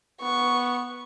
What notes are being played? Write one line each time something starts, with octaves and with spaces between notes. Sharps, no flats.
B3 C#6